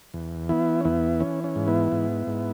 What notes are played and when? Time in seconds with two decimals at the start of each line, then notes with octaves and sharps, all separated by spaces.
0.14 E2
0.49 E3 B3 E4
0.81 C#4
0.85 E2 B3 E4
1.20 E3 C#4
1.44 C#4
1.56 G#2
1.68 B3 E4
1.92 G#2
2.27 G#2